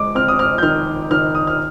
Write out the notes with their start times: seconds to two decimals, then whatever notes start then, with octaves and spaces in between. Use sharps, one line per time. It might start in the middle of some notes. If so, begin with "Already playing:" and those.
Already playing: G#3 D6
0.15 C4 F6
0.28 D#6
0.39 F6
0.58 G6
0.63 D#3 F6
1.11 D#3 F6
1.35 D#6
1.47 F6